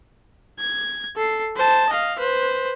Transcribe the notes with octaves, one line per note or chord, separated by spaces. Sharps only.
G#6
A4 C7
C5 A5
D#5 F5
B4 C5